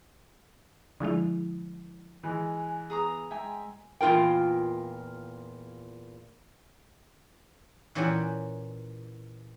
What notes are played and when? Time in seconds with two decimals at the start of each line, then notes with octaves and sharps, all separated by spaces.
1.00 D3 F3 G#3 E4
2.23 E3 G#3 G#5
2.90 B3 G#4 A#5 D#6
3.31 G#3 E5 G5 G#5 A#5
4.01 E2 A#2 F4 A#4 G5
7.95 A#2 E3 C#4 G4 F#5 G#5